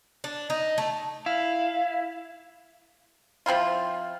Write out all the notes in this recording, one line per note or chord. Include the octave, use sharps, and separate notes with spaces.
D4
D#4
A3
E4 F5
F3 C4 E4 F4